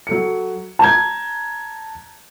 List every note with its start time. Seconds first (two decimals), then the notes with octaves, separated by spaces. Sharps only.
0.07 F#3 A4 C#7
0.79 A5 A#5 G6 G#6